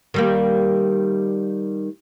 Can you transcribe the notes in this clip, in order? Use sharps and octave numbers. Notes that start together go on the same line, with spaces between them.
D#3 G3 A#3